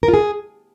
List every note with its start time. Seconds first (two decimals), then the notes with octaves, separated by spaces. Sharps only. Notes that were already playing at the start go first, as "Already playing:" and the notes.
0.03 A#4
0.08 F4
0.14 G#4